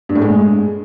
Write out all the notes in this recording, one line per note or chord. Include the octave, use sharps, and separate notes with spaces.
G2
A2
G#3